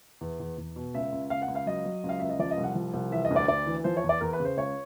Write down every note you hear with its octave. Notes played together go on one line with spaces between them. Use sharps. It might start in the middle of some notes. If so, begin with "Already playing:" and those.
E2
E2
E2
B2
C#2 E5
C#2
C#2 F5
F#5
C#2
F5
F#3 D#5
F#3
C#2
F5
C#2 E5
D#5
F3 D5
D#5
C2
F#5
F3
C2
E3 E5
D#5
D2
D5
D2 D5
E3
F3 C5
C#5
E2
D5
E2 A#4
B4
C#3 C5
C#2 C#5